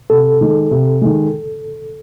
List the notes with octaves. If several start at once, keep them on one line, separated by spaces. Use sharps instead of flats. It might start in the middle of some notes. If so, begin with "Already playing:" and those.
C3 A4
D#3 G#3
C3
D#3 G#3